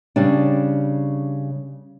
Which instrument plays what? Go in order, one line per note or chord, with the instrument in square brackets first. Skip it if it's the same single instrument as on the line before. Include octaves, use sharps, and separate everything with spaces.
[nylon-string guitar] C#3 G3 D4